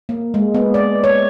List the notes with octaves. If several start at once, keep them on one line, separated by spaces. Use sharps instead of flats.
A#3
G#3
B3
D5
C#5